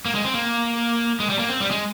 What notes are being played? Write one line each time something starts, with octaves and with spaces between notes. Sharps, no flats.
A#3
G#3
C4
A#3
G#3
G3
A#3
C4
G3
G#3